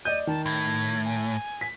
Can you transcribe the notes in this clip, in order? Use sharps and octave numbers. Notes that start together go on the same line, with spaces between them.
D5 D#5 G6 D#7
D#3 A5
A2 G#6
G#5
B6